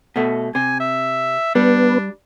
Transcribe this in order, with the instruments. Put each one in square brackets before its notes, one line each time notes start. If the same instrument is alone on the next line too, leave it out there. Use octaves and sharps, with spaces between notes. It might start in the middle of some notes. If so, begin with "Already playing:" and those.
[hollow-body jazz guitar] B2 A3
[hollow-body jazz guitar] C3 [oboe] G#5
[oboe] E5
[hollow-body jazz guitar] G3 [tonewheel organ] B3 [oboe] D4